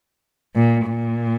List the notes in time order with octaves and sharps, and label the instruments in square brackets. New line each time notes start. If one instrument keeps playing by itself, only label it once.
[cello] A#2
A#2